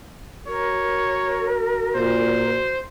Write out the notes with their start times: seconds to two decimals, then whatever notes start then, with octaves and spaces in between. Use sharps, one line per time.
0.47 F#4 A#4 C#5
1.95 A#2 C5